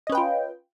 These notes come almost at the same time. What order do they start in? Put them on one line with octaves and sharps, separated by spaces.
D#5 C#4 B4 G5 F4